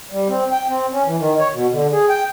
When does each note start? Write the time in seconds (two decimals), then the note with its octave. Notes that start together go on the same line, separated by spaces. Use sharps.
0.11 G3
0.29 C4
0.52 G5
0.68 C4
0.93 C#4
1.06 E3
1.20 D#3
1.40 C#5
1.54 B2
1.72 D3
1.92 G#4
2.09 G5